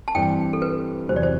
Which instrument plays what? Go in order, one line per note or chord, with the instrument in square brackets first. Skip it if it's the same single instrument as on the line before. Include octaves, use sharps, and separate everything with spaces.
[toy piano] A5
[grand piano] G2 E3 G3 C4 G4 [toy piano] G5
[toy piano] A4
B4
[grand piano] E2 C3 F#3 [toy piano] C5
[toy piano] D5
C5